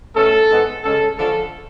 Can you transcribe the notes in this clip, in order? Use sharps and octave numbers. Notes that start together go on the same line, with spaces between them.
B2 A3 C#4 A4
G#2 G#3 B3
C#3 G#3 C#4 A4
D3 F3 G#3 C#4 A4